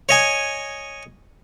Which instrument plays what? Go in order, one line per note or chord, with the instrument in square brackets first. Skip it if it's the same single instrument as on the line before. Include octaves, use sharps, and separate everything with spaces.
[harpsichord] C#5 D#5 G#5